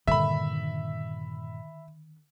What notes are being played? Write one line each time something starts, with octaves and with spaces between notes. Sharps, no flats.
G2 A#2 D3 D#3 E5 B5